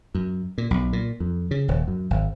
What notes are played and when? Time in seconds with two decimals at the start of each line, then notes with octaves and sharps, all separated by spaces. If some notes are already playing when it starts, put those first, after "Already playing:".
0.15 F#2
0.58 A#2
0.71 B1
0.93 A#2
1.20 F2
1.51 C#3
1.68 D#1
1.88 F#2
2.10 G#1